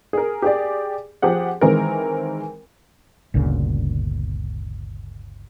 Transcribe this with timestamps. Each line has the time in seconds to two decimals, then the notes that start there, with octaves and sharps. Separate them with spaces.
0.13 G#4 A#4
0.42 G4 G#4 D5
1.22 F3 G4 G#4 F#5
1.61 D#3 E3 G#3 C4 A#4
3.34 G1 D2 A#2 C#3